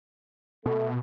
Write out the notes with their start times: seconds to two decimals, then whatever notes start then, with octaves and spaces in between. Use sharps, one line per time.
0.66 B2 A3